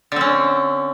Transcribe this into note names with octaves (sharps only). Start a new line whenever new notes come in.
D3 C4 C#4